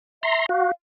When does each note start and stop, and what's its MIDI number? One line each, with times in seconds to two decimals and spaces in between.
0.23 0.44 76
0.23 0.46 82
0.23 0.46 84
0.49 0.71 66
0.49 0.71 77